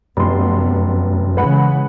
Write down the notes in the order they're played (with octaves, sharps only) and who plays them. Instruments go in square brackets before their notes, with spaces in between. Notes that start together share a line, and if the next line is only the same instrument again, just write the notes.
[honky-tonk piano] F1 C6 [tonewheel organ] F#2 [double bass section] B3
[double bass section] C#3 E3 G#3 [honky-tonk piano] B4 F#5 B5